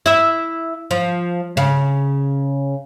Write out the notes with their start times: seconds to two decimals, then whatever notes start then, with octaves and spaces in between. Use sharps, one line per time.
0.06 E4 E5
0.91 F3
1.57 C#3